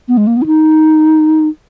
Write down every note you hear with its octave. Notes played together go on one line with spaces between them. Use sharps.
B3
G#3
A#3
B3
E4
D#4